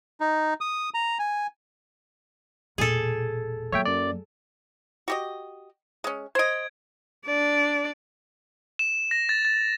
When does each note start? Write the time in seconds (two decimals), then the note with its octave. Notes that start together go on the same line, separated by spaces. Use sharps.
0.21 D#4
0.61 D#6
0.94 A#5
1.19 G#5
2.78 E1 A#2 G#4 A4
3.72 F#3 A#3 C#5 E5 G5
3.85 F#2 D5
5.08 F#4 G4 D#5
6.04 G#3 C#4
6.35 C5 D#5 G#6 D7
7.26 D4 D5
8.79 E7
9.11 A#6
9.29 A6
9.45 A6